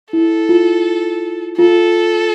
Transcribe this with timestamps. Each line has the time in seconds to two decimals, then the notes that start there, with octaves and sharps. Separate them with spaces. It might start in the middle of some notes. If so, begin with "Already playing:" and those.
0.13 E4 A4
0.49 F4
1.58 F4 A4